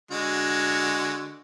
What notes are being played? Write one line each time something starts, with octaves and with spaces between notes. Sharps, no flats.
D3 G#3 F#4